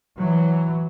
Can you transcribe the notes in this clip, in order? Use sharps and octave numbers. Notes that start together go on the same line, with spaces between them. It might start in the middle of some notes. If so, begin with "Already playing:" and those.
E3 F#3